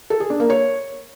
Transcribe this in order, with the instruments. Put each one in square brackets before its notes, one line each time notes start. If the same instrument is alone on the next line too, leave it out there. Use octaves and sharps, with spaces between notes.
[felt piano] A4
G#4
D4
A#3
C#5